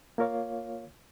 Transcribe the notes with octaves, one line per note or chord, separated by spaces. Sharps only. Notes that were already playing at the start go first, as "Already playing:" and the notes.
A#3 F4 A#4 C#5 F5